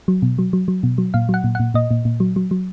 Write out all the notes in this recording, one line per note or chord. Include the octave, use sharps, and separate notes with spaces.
F#3
B2
F#3
F#3
F#3
B2
F#3
A#2 F5
F#3
F#5
A#2
A#2 F#5
A#2 D#5
A#2
A#2
F#3
F#3
F#3